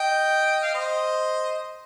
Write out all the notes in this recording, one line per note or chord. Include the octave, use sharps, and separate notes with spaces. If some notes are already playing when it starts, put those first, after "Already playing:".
Already playing: D#5 G5
F5
C5 D#5